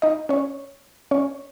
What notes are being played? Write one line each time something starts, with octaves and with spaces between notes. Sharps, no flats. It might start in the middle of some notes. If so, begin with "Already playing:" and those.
D#4 D#5
C#4 C#5
C#4 C#5